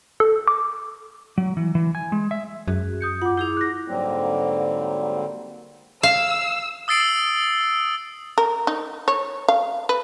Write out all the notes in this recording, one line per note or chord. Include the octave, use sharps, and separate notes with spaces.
A4
D6
F#3
E3
E3
G#5
G#3
E5
F#2 F#4 G#4
D#6 G6 C#7
F4 F#5 D6
E4 G#4 D6 G6 F7
F#6 A#6
G#2 D3 F#3 G3 A#3 C4
F5 E6
D#6 E6 A6 C7 D7 F#7
A#4
D#4
C#5
F5
B4